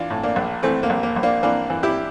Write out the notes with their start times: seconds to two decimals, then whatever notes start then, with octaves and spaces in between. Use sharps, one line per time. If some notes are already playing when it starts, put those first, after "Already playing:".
Already playing: E3 D4 F4
0.10 A2
0.23 A#3 D4
0.36 A#1
0.63 E3 A3 C4
0.83 A#3
0.90 A#1
1.03 A#3
1.16 A#1
1.23 A#3 D4
1.43 E3 A#3 D4
1.70 E3
1.83 E4 G4